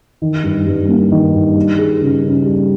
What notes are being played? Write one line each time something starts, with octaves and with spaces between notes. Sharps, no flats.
D#3
G2
G2
A#3
D#3
G2
G3
G#4
C#3
C#4
G3